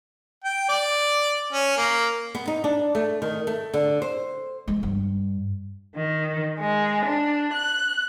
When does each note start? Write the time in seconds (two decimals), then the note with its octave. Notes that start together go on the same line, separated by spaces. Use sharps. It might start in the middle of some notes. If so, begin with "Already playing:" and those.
0.44 G5
0.69 D5
1.53 C#4
1.77 A#3
2.35 B3
2.47 D#4
2.64 D4
2.95 A3
3.22 D#3
3.47 A3
3.74 D3
4.02 C5
4.68 G#3
4.83 G2
5.95 D#3
6.59 G#3
7.04 D4
7.52 F#6